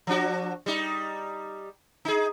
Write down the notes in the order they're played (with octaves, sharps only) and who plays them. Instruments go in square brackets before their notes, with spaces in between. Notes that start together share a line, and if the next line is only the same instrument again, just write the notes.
[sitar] F3 D4 F#4
G3 D#4
D#4 G#4